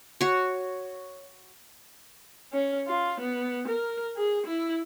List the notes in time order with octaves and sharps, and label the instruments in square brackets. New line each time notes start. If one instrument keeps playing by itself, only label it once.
[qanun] F#4 C#5
[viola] C#4
F4
B3
A#4
G#4
E4